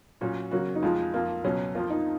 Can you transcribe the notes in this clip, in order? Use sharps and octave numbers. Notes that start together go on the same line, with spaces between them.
A#2 F#3 C#4 F#4
C#3 F#3 A#3 F#4
D#4
F2 F3 G#3 F4
F2 F3 A#3 F4
C#2 B2 F#3 C#4
F2 F3 A#3 F4
D#4